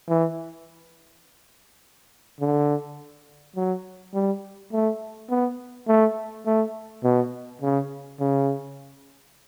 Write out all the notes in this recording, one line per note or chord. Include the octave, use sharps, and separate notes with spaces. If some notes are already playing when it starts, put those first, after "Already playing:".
E3
D3
F#3
G3
A3
B3
A3
A3
B2
C#3
C#3